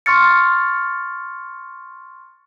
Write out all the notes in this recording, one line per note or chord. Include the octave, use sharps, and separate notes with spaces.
C6 C#6 F6 A6 C#7